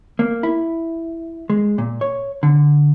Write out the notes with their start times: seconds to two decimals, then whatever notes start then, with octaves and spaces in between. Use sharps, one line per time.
0.19 A#3
0.43 E4
1.50 G#3
1.78 A#2
2.01 C#5
2.43 D3